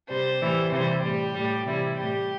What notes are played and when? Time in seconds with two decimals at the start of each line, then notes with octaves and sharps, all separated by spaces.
0.08 C3 G3 C5
0.40 A2 E3 G3
0.71 C3 E3 G3 C5
1.02 A2 G3 G4
1.33 A2 G3
1.65 C3 E3 G3 E4
1.96 A2 G3 G4